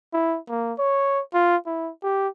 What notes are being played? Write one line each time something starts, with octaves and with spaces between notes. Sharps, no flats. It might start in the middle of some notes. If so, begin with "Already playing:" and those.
E4
A#3
C#5
F4
E4
G4